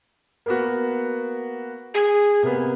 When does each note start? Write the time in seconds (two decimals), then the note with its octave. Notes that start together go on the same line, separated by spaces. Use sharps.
0.46 A#3 B3 F#4
1.94 G#4
2.43 C3 A#3 B3